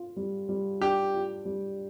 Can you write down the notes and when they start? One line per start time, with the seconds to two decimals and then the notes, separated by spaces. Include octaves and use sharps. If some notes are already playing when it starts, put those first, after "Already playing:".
Already playing: F4
0.16 G3
0.49 G3
0.80 D4 G4
1.14 F4
1.45 G3